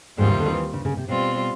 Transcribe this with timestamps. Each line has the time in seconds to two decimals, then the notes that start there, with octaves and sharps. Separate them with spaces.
0.18 D#2 G#2 D#3 G3 C4 F4
0.29 C3
0.40 D3
0.52 E3
0.73 C#3
0.85 C#3
0.97 C3
1.08 B2 G3 C4 F4